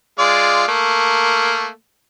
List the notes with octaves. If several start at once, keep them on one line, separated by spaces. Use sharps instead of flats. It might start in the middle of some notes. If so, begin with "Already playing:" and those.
G#3 F4 D5
A3 A#3